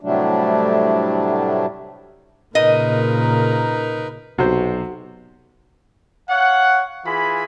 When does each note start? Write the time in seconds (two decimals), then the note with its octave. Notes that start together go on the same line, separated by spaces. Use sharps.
0.01 A2 C3 F#3 G3 A3 D4
2.55 A#2 C#3 D#4 A#4 B4 D#5
4.38 B1 C3 F#4 C5
6.29 C#5 F5 F#5
7.06 E3 F4 G#4 B5